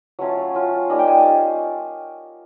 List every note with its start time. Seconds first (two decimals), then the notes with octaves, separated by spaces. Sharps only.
0.19 F#3 A3 C#4 F4
0.54 F#3 A3 C#4 F4
0.90 G3 A#3 D#4 G#5
0.99 G5
1.08 G#5
1.17 A5